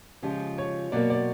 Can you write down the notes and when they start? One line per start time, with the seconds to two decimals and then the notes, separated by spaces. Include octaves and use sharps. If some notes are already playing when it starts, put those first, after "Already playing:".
0.22 C#3 F3 G#3 G4
0.58 C#5
0.92 B2 F#3 A#3 D5
1.10 D5